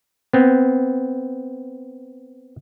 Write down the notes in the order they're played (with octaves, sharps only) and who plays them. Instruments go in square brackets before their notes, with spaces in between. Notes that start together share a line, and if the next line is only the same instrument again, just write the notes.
[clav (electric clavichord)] B3 C4